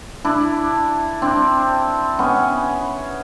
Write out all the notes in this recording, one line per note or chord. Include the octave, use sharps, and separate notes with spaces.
D4 E4
C4 D4
B3 C#4